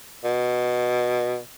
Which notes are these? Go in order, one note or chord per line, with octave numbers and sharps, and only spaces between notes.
B2